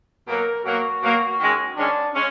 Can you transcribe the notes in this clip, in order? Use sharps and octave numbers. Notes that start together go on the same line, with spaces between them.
B2 F#3 A#3 A#4
B2 F#3 A#3 F#4
B2 F#3 A#3
D#3 G#3 C#4
D#3 G#3 C#4 D4
G#3 C#4